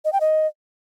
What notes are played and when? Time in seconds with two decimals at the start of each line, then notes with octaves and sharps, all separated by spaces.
0.05 D#5
0.13 G5
0.21 D#5